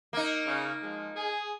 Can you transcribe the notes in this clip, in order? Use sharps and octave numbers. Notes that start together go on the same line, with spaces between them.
A#3 D#4
C#3
F3 G#3
G#4